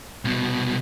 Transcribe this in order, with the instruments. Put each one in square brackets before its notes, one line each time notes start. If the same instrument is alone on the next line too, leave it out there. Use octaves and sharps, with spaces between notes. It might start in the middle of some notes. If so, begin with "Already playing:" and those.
[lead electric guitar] C2 B2